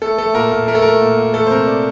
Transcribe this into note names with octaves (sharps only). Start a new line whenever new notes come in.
A3 A4
A3 A4
A#2 A#4
A#2
A3 A#4
A4
A3 A#4
A#2
A#2
A3 A4
C5
C3 A#4
D5